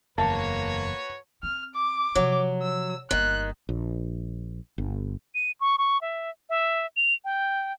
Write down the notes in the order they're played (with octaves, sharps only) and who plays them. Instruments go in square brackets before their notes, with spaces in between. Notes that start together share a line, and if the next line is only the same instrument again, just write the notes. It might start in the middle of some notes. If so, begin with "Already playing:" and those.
[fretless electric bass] F#1 E2 [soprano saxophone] A#3 [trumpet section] F#4 B4 C#5 [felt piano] A5
[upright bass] C4 [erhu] F6
[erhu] D6
[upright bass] C3 F3 [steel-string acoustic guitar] F#3
[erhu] E6
[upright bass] G1 A#3 [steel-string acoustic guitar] D#3 [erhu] F#6
[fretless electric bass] A#1
G1
[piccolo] D#7
C#6
C#6
E5
E5
F7
G5